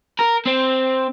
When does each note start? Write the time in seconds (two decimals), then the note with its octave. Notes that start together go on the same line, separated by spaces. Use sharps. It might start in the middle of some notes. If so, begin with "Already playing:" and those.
0.19 A#4
0.46 C4